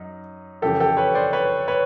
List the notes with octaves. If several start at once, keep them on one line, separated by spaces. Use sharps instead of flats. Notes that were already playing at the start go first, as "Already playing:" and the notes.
Already playing: F#2 D#4
F2 C#3 E3 G4 A4
G4 A4
B4 C#5
C5 D5
B4 C#5
B4 C#5